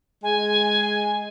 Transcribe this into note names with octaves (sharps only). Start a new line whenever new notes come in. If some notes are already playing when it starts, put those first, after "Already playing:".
G#3 G#5